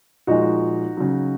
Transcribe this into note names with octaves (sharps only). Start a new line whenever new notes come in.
A#2 F3 G#3 D#4 F#4
C#3 F#3